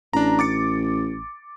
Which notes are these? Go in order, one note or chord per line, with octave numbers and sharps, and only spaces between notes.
A1 D4 A#5
D6 A6 C#7